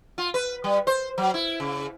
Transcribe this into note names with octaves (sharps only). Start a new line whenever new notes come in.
F4
B4
G3
C5
F#3
E4
C#3